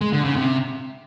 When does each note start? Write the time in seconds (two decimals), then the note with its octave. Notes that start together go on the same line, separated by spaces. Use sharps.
0.01 G#3
0.13 D3
0.25 C#3
0.36 C3